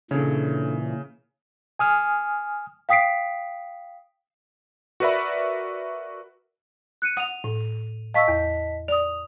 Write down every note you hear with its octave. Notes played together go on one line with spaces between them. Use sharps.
A#2 C#3 E3 D4 A4 C#5
G#5 D#6 F6
F5 G5 D#6 B6 C7 D7
F#4 A#4 B4 D5 E5 B5
F#6 C#7 D#7
F#5 D#6 D#7 F7
A2
D#5 F5 A5 C#6 E6 B6
E2
D5 D#6 F7